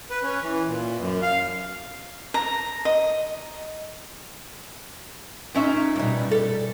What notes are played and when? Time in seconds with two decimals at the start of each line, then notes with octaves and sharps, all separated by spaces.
0.10 B4
0.23 C#4
0.42 E3
0.66 A#2
1.00 F#2
1.23 F5
2.34 A#5
2.85 D#5
5.54 A#2 C#4 D#4 E5
5.96 G2 B2 G3 D#4
6.31 A4